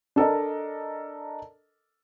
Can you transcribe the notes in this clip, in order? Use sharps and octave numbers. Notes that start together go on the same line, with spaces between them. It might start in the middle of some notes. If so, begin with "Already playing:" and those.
D4 A4 A#4 D#5